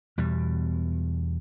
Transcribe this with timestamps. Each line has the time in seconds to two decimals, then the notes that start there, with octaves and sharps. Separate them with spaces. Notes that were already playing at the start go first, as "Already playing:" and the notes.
0.18 E2 B2 G3